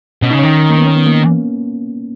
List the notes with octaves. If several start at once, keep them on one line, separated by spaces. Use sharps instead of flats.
B2 C#4
C#3 D#4
D#3 C#4
A#3
B3
C#4
B3
A#3